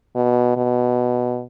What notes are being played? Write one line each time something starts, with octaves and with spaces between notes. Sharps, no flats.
B2
B2